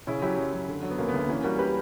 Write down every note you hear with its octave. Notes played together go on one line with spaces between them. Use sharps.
C#3 C#4 E4
F#3 E4 G4
F#2
F#2
D3
F#3
B3
D2 A#3 C#4
B3
D2 A#3
E3 A#3 C#4
G3 F#4 A#4
G4 B4